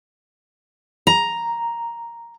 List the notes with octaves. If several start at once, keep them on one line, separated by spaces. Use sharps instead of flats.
A#5